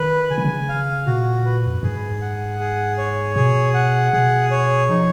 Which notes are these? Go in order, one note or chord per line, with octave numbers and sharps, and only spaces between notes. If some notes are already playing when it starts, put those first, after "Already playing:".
Already playing: D#3 B4
C#3 G#5
D#3
C#3
F5
A#2 F#4
B4
F2
F#2
G#2 G#4
F#5
G#4
C#5
B2 G#4
F#5
B2 G#4
C#5
F3 D#4